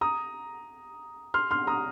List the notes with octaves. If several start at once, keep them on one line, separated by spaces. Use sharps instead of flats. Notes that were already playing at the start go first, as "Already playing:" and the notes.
A#5 D#6
C6 F6
C6 F6
A#5 D#6